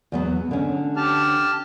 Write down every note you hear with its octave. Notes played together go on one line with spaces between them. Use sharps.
E2 F#3 B3
D3 C#4
G4 A5 F6